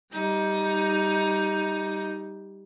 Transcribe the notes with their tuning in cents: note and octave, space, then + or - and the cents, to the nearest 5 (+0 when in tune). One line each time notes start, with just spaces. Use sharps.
G3 +0 D#4 +15